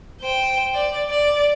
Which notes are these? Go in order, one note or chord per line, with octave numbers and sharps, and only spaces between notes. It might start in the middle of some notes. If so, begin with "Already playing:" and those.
C5 G5
D5
D5